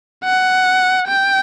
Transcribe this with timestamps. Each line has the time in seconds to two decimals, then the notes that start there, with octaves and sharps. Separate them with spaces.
0.24 F#5
1.08 G5